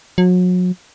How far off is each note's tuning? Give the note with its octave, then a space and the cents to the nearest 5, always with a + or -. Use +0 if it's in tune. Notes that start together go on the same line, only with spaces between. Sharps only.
F#3 -35